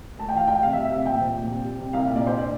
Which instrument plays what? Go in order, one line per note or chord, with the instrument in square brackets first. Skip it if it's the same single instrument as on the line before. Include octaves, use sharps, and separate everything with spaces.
[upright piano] A2 A5
G5
E3 F5
A2 G5
C3 F5
E5
G3
E5
C3 F5
A#2 G5
F3
A#2
C3
G3
C3
C2 F5
A#2
D5
D4 C5
D5